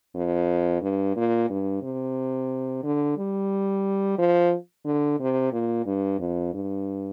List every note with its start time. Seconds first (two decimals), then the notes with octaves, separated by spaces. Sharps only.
0.15 F2
0.82 G2
1.16 A#2
1.50 G2
1.83 C3
2.83 D3
3.18 G3
4.19 F3
4.86 D3
5.20 C3
5.52 A#2
5.86 G2
6.19 F2
6.54 G2